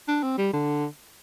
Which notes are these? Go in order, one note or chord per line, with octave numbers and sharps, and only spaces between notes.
D4
C4
G3
D3